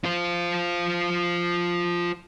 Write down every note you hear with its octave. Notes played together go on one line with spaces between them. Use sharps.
F4 C5